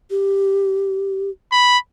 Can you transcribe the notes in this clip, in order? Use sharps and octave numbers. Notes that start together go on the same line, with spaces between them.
G4
B5